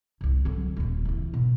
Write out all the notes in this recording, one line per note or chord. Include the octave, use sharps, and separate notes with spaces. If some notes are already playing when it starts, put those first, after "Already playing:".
C2 C#3
D3 F#3
D#1 F2
C#3 E3
B2